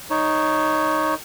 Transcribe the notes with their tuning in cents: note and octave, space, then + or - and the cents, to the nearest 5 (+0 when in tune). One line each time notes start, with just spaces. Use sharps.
D#4 +0 C#5 +0